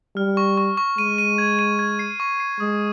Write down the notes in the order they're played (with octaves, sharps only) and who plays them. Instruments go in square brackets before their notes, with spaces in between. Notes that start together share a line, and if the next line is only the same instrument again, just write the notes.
[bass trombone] G3 [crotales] F6
[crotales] C#6
C#6
C#6
[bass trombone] G#3 [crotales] D#7
[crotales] D#7
G#6
D#7
G#6
C7
C#6
C7
[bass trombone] G#3 [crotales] D#6